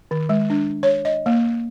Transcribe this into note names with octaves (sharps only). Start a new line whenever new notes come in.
D#3
G#3
D4
C#5
D#5
A#3